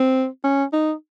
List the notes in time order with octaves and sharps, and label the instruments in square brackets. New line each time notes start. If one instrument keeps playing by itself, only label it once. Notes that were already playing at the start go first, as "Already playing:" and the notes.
Already playing: [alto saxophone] C4
C#4
D#4